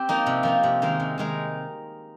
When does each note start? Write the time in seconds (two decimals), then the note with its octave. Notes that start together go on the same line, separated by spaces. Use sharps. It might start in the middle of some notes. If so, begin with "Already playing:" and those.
Already playing: C4 G4
0.09 F3 A#3 D#4
0.26 C3
0.43 F3 A#3 D#4
0.63 C3
0.82 D#3 G#3 D#4 A#4
1.00 C3
1.18 D#3 G#3 D#4 A#4